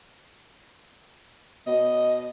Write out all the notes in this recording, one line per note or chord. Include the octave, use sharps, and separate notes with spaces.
B2 D#5